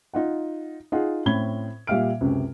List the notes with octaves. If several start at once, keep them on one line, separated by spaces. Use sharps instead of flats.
D#4 F4 F#5
D#4 F4 G#4 F#5
A2 C4 C#4 B5 G#6 G7
A#2 G3 E5 F5 F6 D7
C#2 F#2 C3